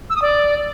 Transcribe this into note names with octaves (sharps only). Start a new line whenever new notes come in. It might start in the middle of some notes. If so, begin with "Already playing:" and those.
E6
D#6
D5